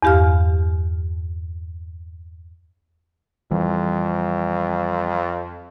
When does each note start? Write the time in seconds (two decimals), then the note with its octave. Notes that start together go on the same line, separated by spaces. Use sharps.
0.03 E2 G2 G4 F5 F6
3.51 F2 E3 G3